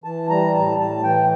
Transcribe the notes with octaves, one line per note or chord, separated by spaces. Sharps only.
E3 A5
G3 A#5
A2 A5
A2 A5
E3 G5